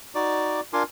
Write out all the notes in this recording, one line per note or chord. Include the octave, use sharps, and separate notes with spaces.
D#4 F#4 D5 D6
D4 F4 A#4 G#5 C6 D6